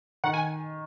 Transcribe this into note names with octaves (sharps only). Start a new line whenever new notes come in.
D#3 F#5
G#5